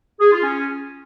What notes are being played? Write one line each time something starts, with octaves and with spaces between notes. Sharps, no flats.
G#4
F4
C#4